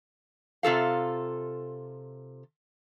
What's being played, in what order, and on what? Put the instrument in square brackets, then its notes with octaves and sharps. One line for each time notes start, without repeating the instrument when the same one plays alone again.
[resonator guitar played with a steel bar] C3 F4 A4 F5